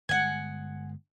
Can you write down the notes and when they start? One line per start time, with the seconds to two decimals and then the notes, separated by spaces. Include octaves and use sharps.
0.09 G1 G#3 F#5 G#5